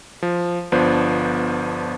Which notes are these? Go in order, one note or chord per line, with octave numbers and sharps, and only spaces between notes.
F3
G1 F3 B3 D4 C5